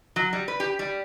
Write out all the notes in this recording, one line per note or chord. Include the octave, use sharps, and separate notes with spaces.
F#3
G3
B4
G4
G3